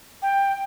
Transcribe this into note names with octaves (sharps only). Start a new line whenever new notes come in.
G5